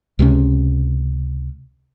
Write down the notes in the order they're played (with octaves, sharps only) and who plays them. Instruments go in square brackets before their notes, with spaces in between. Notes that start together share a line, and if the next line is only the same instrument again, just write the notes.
[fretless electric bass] C#2 C3 F3 C#4